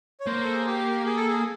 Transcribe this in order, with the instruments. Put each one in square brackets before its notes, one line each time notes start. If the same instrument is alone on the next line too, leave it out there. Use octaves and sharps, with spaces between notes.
[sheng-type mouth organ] C#5
[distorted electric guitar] A#3 [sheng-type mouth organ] C5
[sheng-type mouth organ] A4
G#4
G4
G#4
A4
G#4